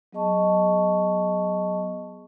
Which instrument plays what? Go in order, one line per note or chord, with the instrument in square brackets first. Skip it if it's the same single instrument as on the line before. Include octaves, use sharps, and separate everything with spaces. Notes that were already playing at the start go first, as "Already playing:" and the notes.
[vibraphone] F#3 B3 G#4 D#5 A5 C#6